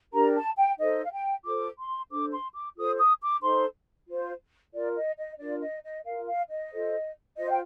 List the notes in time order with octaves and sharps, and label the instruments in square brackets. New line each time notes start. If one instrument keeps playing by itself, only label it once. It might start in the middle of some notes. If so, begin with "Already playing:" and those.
[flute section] D4 G4 A#4 A#5
A5
G5
D#4 A4 C5 D#5
F5
G5
F4 A4 C5 D6
C6
D4 A4 C5 D6
C6
D6
F4 A4 C5 D#6
D#6
D6
D#4 A4 C5 C6
F4 C5
F4 A#4 D5
D#5
D#5
D4 F4 A#4 D5
D#5
D#5
F4 A#4 F5
F5
D#5
F4 A4 C5
F4 C5 D#5
G5